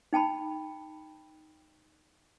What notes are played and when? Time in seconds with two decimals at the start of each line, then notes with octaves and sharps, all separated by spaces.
0.13 D#4 G5 A5 B5